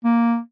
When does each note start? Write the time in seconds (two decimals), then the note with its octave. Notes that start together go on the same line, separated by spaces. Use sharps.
0.04 A#3